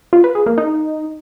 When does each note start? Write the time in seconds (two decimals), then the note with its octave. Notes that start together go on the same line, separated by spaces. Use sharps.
0.13 F4
0.24 B4
0.35 G#4
0.46 A#3
0.58 D#4